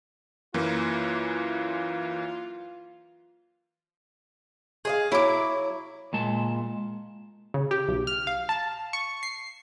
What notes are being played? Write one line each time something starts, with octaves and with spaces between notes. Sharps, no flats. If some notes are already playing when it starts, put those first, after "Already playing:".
F#2 E3 A#3 F4
G#4 D#5 F5
F#3 E4 D6
A#2 G#3 A5
C#3
G4
B1
F6
F5
A5
C#6
C7